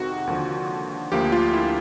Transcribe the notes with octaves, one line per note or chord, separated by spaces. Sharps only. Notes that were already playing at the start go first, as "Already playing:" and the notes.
Already playing: F2 C3 D#3 G#3 F#4
D#2 D3 F3
D2 D3 F3 A#3 G4
F4
E4